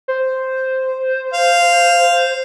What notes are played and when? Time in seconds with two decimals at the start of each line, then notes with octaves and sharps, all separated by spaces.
0.08 C5
1.33 F5